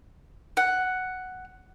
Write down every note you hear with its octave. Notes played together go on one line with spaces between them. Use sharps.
F#5